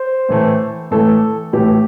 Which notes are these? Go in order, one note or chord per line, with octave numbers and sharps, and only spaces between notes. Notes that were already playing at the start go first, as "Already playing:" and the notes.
Already playing: C5
A2 E3 A3
A2 E3 A3 A4
A2 E3 A3 G4